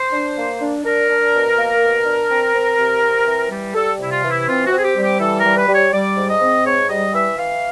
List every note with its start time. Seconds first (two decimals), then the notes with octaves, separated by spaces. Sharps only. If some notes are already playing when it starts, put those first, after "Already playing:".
Already playing: C5
0.12 D4
0.37 A#3
0.61 D4
0.85 D4 A#4
1.09 D4
1.33 B2
1.58 A#3
1.82 B2
2.06 D4
2.29 C4
2.55 C4
2.78 C3
3.02 C4
3.26 E3
3.50 G3
3.75 G3 A4
3.99 C3 E4
4.11 F4
4.24 E3
4.30 E4
4.48 C4 F4
4.66 F#4
4.71 C4
4.77 G#4
4.84 G4
4.96 G3
5.02 G4
5.20 E3 A4
5.39 A#4
5.44 G3
5.56 B4
5.68 G3
5.74 C#5
5.92 G3 D5
6.16 G#2
6.29 D#5
6.41 C4
6.65 G#2 C#5
6.89 G3 D#5
7.13 E3 E5
7.37 E3 F5